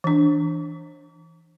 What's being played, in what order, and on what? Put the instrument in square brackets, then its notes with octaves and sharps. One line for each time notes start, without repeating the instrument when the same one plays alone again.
[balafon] E3 D4